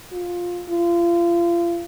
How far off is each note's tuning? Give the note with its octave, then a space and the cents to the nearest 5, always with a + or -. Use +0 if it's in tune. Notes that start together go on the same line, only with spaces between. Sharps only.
F4 +10
F4 -30